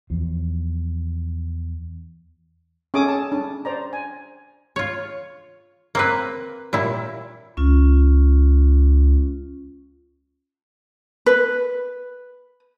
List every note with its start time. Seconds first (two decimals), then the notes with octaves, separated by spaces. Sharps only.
0.10 E2 F3
2.94 C#4 G#4 A4 D6 D#6
3.08 A5
3.32 D4
3.65 C5 D5 A#5
3.93 G#5
4.76 F4 C#5
5.95 A#3 C4 B4
6.73 A#2 G3 E4
7.57 C#2 C#4 F4
11.26 B4